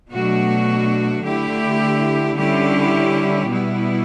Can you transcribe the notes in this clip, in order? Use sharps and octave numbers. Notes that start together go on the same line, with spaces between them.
B2 F#3 A3 D4 F#4
D3 A3 E4 G4
D3 G3 C#4 E4 G4
B2 G3 B3 E4